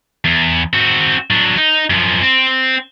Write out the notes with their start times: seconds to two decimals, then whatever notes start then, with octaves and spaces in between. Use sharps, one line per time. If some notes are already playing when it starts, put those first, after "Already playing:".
0.25 E2
0.73 C4 F#4
1.31 F#3 D4
1.57 D#4
1.90 F#2 F3
2.22 C4